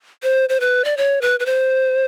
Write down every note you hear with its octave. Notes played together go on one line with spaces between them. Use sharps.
C5
C5
B4
D5
C#5
B4
B4
C5